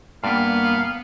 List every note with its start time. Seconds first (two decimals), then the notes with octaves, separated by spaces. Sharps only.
0.24 G2 A#3 B3 D5 F5